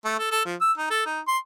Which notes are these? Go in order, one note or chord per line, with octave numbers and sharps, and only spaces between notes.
A3
A4
A4
F3
E6
D#4
A4
D#4
C6